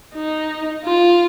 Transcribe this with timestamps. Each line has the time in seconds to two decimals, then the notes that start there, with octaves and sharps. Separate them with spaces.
0.15 D#4
0.84 F4